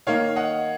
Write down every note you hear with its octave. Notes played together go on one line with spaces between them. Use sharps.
D#3 A#3 D#4 C#5 F5
D#5 F#5